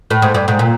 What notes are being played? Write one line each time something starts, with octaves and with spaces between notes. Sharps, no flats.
A2
G#2
G2
G#2
A#2